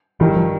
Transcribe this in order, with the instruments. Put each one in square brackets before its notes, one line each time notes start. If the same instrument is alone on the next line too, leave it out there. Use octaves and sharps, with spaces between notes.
[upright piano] G2 D#3 G3 [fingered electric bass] E3
[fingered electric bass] F3